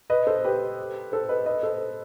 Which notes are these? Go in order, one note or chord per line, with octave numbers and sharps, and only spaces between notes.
B4 D#5
A4 C5
G4 B4
A4 C5
B4 D#5
B4 D#5
A4 C5